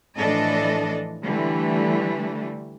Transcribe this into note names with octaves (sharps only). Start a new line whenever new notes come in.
A2 E3 F3 D4 A4 D#5
D3 E3 G3 A3